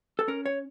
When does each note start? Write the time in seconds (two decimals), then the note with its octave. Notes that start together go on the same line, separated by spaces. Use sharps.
0.19 A4
0.28 C#4 A#4
0.46 C#5